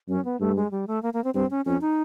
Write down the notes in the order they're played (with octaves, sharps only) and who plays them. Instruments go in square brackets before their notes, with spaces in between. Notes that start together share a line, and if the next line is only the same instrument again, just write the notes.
[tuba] F#2 [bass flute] C#4
[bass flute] B3
[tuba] G2 [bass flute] A3
[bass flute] G#3
G3
A3
A#3
A#3
C4
[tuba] G2 [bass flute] C4
[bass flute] C#4
[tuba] F2 [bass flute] C#4
[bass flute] D#4